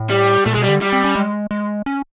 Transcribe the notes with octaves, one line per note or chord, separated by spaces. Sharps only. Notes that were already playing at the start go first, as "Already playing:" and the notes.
Already playing: A2
G3
A#2 A3
B2 G#3
G3
D3
G3
C4
C#4
G#3
G#3
C#4